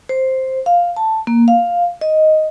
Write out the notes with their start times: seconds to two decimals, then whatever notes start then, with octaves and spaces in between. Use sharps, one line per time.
0.09 C5
0.66 F5
0.97 A5
1.27 A#3
1.48 F5
2.01 D#5